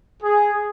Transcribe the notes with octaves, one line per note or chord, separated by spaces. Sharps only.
G#4